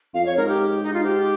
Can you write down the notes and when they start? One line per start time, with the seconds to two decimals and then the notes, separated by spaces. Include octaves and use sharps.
0.14 F2 F5
0.26 C#5
0.37 G#2 A#4
0.48 G4
0.83 D#4
0.94 F4
1.04 G#2 G4